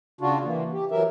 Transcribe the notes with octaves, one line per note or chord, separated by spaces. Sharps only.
C#3 D4 F4 F#4
E3 A#3
G4
E3 F#3 A#4 E5